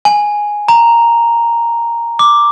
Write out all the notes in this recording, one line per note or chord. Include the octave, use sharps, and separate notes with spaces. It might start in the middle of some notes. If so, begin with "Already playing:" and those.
G#5
A#5
D6